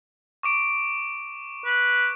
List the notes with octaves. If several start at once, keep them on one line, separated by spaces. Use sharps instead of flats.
C#6 D6 D7
B4